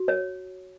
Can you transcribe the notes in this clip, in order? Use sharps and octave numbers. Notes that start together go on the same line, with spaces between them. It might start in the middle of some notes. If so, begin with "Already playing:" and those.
Already playing: F#4
C#5